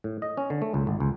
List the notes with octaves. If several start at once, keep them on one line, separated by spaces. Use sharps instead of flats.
A2
D#5
C#4
D3
A3
C#2
G#1
C#2